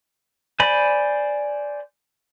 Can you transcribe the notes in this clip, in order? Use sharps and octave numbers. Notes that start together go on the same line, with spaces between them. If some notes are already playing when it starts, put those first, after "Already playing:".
C5 D5 G#5 B5